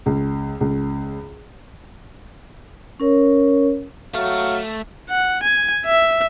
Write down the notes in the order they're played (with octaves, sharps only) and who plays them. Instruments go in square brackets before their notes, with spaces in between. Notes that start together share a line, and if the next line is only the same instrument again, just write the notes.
[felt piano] C#2
C#2
[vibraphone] C#4 A#4 C#5
[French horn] F#3 [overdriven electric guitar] A3 [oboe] F5
[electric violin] F#5
G#5
E5